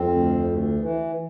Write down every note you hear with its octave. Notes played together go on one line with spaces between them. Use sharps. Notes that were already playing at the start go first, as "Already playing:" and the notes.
Already playing: F2 C4
D2
D2
E3